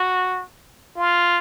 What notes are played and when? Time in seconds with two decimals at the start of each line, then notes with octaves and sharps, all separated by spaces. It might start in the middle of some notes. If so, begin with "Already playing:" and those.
Already playing: F#4
0.96 F4